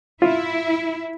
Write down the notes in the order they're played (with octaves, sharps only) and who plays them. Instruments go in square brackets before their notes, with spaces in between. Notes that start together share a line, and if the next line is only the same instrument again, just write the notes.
[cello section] E4 [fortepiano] F4